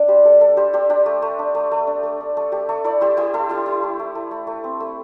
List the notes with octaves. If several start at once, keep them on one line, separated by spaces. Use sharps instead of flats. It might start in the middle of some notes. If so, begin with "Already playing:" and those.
Already playing: D4 D5 E5
G3 G4 C5
G3 A4
D4 A4
G3 G4 C5
D4 G4 C5
D4 G4
A3
A3
D4
A3
A3
D4
A3
D4
A3 A4
A3 G4
A3 A4
E4 A4 D5
E4 G4 C5
E4 G4 C5
E4 A4
E4 G4
E4
A3
A3
A3
A3
A3
C4
A3